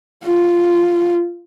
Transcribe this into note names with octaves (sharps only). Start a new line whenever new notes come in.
F4